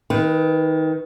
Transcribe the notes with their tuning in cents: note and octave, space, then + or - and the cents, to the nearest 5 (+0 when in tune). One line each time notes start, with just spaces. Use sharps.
D#3 +25 B4 +0